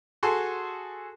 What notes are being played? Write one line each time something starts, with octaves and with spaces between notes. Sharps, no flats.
F#4 G#4 A4 G#5 A5 C6